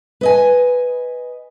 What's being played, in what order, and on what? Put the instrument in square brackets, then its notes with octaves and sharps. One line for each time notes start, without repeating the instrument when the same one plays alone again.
[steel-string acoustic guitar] B4 D#5 G#5